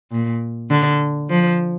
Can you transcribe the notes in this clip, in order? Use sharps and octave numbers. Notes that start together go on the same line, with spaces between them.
A#2
D3
F3